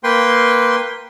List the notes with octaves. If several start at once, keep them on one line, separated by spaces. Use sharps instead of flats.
A#3 B4 G5 C6